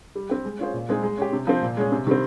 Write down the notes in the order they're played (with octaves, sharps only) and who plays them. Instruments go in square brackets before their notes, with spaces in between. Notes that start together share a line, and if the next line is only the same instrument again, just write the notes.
[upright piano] G3
C4 G4
G#3
C#4 F4 G#4 C5
A#2
G#3 C4 D#4 G#4
G#3
C#4 G4
C3
F3 C4
A#2
G#3 C#4 G#4
C3
D#3 G3 C4